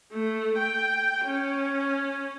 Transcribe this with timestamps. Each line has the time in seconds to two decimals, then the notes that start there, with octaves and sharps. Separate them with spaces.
0.13 A3
0.58 G5
1.26 C#4